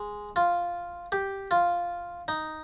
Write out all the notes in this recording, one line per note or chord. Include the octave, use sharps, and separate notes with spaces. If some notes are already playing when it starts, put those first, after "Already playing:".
Already playing: G#3
F4
G4
F4
D#4